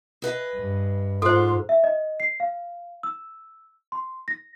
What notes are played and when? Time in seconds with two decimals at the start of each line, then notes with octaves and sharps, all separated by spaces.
0.22 G#4 B4 D#5
0.55 G2
1.22 G#2 F4 A4 C5 C6
1.69 E5
1.84 D#5
2.20 C7
2.40 F5
3.03 E6
3.92 C6
4.28 A#6